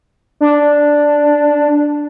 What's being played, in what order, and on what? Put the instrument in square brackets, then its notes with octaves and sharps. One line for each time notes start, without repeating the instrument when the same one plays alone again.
[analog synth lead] D4